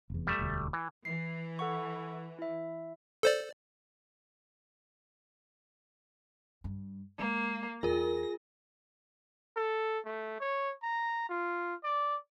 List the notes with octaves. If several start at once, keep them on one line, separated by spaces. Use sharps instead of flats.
F1 E2
G3 A3 E5
E1 D2
E3
E3 C7
A4 F#5 C#6
E4 E5
A4 C5 D5
G2
G#3 A#3
E2 F4 G#4 A#4 A#6
A4
A3
C#5
A#5
F4
D5